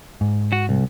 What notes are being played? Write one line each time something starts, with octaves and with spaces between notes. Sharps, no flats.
G#2
F#4
C2